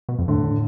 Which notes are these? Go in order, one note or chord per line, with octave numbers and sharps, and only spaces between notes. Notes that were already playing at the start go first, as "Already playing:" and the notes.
B2
F2
A2 D3